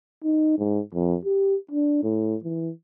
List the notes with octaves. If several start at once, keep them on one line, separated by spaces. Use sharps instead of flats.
D#4
G#2
F2
G4
D4
A2
E3